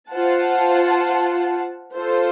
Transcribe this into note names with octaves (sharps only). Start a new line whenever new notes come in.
F4 C5 F#5 A5
F4 A4 C5